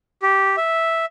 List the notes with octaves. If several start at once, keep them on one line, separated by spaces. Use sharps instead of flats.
G4
E5